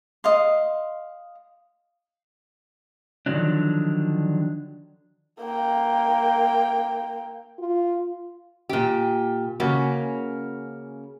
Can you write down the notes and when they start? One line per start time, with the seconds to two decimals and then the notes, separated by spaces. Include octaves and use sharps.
0.24 D#5 F5 C6
3.26 D3 D#3 F3 F#3 D4
5.40 A#3 G5
7.58 F4
8.69 A#2 G4
9.60 C#3 A#3 C#4 F#4